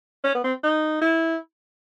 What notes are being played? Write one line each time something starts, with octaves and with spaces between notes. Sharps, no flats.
C#4
B3
C4
D#4
E4